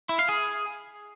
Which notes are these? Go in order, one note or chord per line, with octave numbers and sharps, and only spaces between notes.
E4
F5
G#4